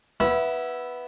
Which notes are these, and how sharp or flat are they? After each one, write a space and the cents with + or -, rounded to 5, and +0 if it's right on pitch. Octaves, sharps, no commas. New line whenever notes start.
B3 +0 E4 +0 B5 -30